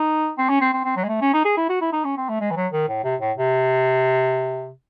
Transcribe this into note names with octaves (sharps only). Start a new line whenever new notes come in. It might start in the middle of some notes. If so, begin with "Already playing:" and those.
Already playing: D#4
C4
C#4
C4
C4
C4
F#3
G#3
A3
C#4
D#4
G#4
E4
F#4
E4
D#4
C#4
C4
A3
G#3
E3
F#3
D#3
A2
C3
A2
C3